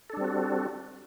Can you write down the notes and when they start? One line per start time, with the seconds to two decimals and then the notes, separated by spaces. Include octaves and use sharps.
0.10 A4
0.13 D4
0.17 G3
0.21 C4
0.24 F#4